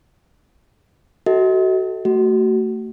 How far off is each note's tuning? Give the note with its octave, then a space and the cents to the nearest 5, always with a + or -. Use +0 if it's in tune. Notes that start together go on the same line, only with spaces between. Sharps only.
F#4 +25 A4 +0 D#5 +40
A3 +25 F#4 +25